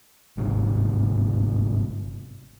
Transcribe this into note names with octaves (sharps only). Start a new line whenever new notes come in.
G1 G#2 C3